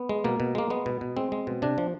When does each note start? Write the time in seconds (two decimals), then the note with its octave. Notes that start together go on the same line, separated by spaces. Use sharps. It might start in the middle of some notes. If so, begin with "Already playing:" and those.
Already playing: B3
0.09 G#3
0.24 B2 A#3
0.40 B2
0.55 G#3 A#3
0.70 G#3 B3
0.86 B2
1.01 B2
1.17 G#3 C4
1.32 G#3
1.47 B2
1.62 C3 D4
1.78 F3